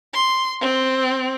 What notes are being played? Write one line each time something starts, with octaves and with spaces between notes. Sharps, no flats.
C6
C4